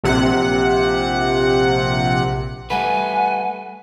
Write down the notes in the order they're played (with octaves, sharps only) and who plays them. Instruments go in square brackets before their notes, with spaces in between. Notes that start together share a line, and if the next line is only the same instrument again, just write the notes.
[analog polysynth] A#1 C3 F#5
[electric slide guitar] G3 A3 B4 [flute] F#5 [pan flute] G#5